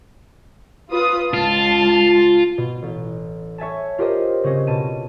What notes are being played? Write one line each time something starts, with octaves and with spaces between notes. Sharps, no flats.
F4 B4 D#6
C#2 F4 A5
B2
A1
C#5 E5 G#5 A5
F4 G4 A#4 C5 D#5
C#3 C4 C#4 D#5
B2 A5 D#7